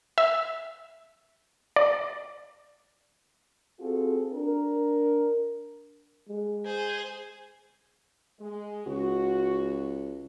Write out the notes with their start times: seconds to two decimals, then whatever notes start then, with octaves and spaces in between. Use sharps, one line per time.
0.18 E5
1.76 D5
3.80 C4 F4 F#4 G#4 A4
4.32 D4 A#4
6.28 G#3
6.65 G#4 C5
8.40 G#3
8.86 C#2 F#4